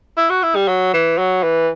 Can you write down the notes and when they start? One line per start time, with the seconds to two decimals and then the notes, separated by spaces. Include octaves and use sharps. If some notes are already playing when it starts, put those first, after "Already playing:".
0.17 E4
0.30 F#4
0.43 E4
0.55 G3
0.68 F#3
0.94 E3
1.18 F#3
1.43 E3